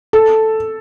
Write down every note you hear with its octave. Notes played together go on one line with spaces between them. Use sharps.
A4